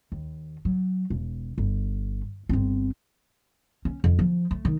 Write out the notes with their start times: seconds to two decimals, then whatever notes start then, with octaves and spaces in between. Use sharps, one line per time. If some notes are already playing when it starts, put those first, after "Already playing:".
0.12 D#2
0.65 F#3
1.10 E1
1.58 G1
2.49 G1 C4
3.85 C#4
4.04 F2
4.19 F3
4.51 A3
4.65 D#3